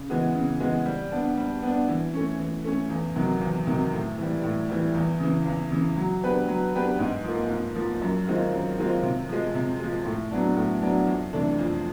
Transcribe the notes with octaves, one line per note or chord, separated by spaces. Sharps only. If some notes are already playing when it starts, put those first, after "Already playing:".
Already playing: C#3
E3 G#3 B3
C#3
E3 G#3 B3
G3
B3 D4
G3
B3 D4
E3
A3 C#4
E3
A3 C#4
E2
C3 D#3 F#3
E2
C3 D#3 F#3
A2
E3 G3
A2
E3 G3
E2
C#3 E3
E2
C#3 E3
F#3
B3 D4 G4 B4
F#3
B3 D4 G4 B4
G#2
F3 A#3
G#2
F3 A#3
F#2
D#3 G#3 C4 F4
F#2
D#3 G#3 C4 F4
C3
F3 G#3
C3
F3 G#3
A2
F#3 B3 D4
A2
F#3 B3 D4
F2
C3 E3 A3 D4
F2